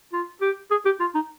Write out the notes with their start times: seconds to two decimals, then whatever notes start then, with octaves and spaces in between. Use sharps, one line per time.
0.13 F4
0.42 G4
0.71 G#4
0.85 G4
1.00 F4
1.15 D#4